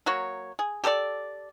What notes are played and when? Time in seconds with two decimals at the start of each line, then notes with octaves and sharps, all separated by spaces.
0.06 F#3 A#3 F#4 C#5
0.59 G#4
0.84 G4 A4 C5 D5